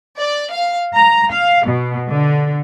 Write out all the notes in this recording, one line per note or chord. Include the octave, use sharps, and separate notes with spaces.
D5
F5
A#5
F5
B2
D3